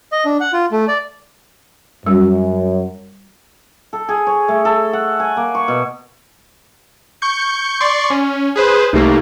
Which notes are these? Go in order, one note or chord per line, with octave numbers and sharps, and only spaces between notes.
D#5
D4
F#5
F4
A3
D5
F#2 G3 F#4
A4
G#4
C#5
A3
A4
F#5
G#5
A#3
C#6
B2
C#6 G6 C#7
D5 C6 C#6
C#4
G#4 B4 C5
C2 A3 A#3 D#4 G4